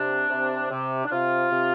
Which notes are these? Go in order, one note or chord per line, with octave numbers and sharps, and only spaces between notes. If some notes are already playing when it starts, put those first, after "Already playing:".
Already playing: C3 D4
C3
C3
D4
C3 F4
C3